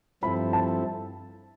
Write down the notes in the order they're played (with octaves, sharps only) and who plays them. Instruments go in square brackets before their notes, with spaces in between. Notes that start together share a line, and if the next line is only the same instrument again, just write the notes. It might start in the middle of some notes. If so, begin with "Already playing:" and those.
[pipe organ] G2 F3 C4 E4 A4 [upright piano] B5
[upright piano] A5